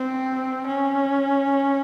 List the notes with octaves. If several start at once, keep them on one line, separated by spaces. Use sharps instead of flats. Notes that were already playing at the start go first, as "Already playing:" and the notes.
Already playing: C4
C#4